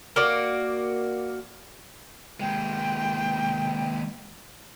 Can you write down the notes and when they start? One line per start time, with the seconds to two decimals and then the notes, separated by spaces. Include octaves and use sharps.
0.16 A#3 F#4 D5
2.40 D#2 G#3 G5